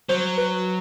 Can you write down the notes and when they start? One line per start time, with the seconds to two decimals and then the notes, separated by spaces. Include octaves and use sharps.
0.09 F#3 C5
0.38 B4